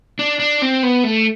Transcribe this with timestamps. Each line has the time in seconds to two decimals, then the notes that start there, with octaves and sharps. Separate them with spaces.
0.19 D4
0.39 D4
0.62 C4
0.83 B3
1.04 A3